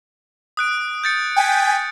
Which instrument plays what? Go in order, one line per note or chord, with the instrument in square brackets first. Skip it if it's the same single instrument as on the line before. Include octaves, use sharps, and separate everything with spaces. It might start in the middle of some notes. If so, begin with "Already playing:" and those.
[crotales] D#6 F#6 D7
G6 A6 C#7
[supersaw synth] G5 G#5 B6